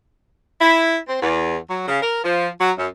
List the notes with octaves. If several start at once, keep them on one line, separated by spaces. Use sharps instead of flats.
E4
C4
E2
F#3
C#3
A#4
F3
F#3
F#2